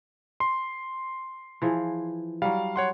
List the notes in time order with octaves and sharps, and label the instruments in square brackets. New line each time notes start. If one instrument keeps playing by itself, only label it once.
[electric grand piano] C6
[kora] E3 F3 G#4
[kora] F#3 G3 [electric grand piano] F5
[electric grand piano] C#5 F#5 C6